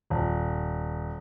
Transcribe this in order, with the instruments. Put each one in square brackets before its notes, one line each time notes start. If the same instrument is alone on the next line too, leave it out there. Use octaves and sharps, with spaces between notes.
[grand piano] D#1